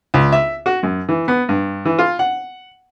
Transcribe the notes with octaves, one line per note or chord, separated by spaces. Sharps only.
C#2
E5
F#4
F#2
E3
B3
G2
E3
F4
F#5